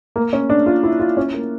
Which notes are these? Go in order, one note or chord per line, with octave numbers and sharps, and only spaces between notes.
A#3
C#4
D4
F4
E4
F4
C#4
A#3